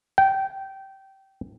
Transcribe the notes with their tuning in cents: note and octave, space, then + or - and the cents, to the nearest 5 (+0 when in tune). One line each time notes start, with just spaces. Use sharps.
G5 -20